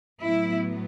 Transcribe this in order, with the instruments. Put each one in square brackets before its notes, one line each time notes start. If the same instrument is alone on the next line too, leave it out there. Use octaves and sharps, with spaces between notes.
[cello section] A2 F#3 B3 E4